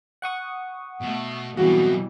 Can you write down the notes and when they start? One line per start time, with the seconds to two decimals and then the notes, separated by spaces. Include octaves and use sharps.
0.22 F#5 C#6 D#6
1.02 B2 A3
1.57 B2 E3 F#3 G3 C4 F#4